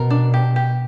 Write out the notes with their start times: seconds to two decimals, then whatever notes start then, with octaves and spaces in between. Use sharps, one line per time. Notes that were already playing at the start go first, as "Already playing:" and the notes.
Already playing: B2 A#4
0.10 D4
0.34 G4
0.56 G4